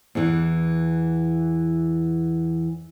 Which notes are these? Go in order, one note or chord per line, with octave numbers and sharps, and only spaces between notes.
E2 E3